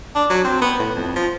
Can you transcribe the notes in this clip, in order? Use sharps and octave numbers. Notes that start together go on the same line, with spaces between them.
D4
F#3
C4
B3
A2
F2
F3